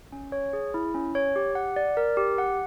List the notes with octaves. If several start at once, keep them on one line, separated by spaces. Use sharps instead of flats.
C#4
C#5
G#4
E4
C#4
C#5
G4
F#5
D5
A#4
G4
F#5